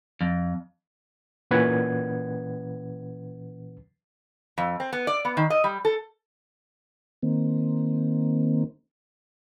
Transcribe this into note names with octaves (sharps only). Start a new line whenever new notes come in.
F2
A#2 E3 C#4 B4 F#5 G#6
F2
C4
B3
D5
B3
D#3
D#5
G3
A4
D#3 A#3 C4